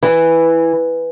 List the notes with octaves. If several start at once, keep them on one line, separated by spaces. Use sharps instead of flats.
E3